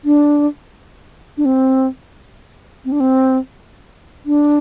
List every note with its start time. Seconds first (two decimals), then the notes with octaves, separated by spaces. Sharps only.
0.05 D4
1.37 D4
1.45 C4
2.85 C4
2.92 D4
3.00 C4
4.26 D4